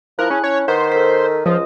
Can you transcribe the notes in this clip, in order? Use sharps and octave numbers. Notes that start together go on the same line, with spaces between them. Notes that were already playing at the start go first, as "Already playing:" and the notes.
F3 E4 A#4 A5 F#6
C#4 G#4
C#4 C#5
D#3 B4 C5 F#5 B6
A4 A#4 B6
C#2 F3 F4 D#5 D#6